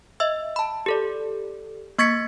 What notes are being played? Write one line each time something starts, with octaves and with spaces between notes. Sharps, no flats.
D#5 E5 E6
A5 B5
G4 A4 D5
A#3 C#6 G#6 A6 B6 C#7